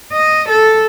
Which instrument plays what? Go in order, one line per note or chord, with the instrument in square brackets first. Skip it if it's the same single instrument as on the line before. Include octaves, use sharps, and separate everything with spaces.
[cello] D#5
A4